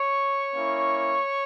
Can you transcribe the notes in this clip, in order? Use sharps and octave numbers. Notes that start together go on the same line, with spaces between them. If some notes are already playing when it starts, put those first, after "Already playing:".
Already playing: C#5 C#6
A#3 C#4 E4